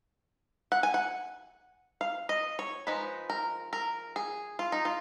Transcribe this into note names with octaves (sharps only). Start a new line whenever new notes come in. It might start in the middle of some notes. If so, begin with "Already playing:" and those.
F#5
G#5
F#5
F5
D#5
C#5
F3 G#3 D#4 B4
A#4
A#4
G#4
F4
D#4
F4